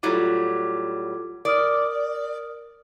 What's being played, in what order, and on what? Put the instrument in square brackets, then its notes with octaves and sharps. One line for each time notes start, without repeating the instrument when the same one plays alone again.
[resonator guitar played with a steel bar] A2 F#3 G3 [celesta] F4 A4 D6
[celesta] A#4 D#6 F6 [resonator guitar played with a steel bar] D5